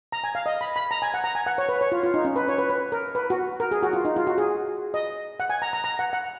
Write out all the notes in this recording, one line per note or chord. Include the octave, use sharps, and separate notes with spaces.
A#5
G#5
F5
D#5
B5
B5
A#5
G#5
F#5
A#5
G#5
F#5
C#5
B4
C#5
F4
F4
D#4
C#4
B4
C#5
B4
B4
A#4
B4
F#4
A#4
G#4
F#4
F4
D#4
F4
F#4
G#4
D#5
F#5
G#5
A#5
A#5
A#5
F#5
F#5